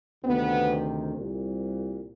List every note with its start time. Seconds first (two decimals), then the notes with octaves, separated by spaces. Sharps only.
0.24 D2 C3 D#3 B3
1.15 C2 A#2